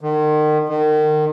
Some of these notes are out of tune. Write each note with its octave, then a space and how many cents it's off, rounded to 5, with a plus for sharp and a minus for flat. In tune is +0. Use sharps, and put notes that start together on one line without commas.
D#3 -35
D#3 -30